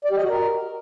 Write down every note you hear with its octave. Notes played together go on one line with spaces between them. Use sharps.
D5
G4
D#5
F#4
A#4